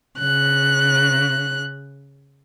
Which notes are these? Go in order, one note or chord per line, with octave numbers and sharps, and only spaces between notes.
C#3 F#6